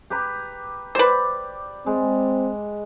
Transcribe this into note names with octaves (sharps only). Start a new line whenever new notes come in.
G4 B4 A#5
G4 B4 C5 D5
G#3 C4